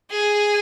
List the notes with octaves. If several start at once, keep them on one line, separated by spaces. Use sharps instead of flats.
G#4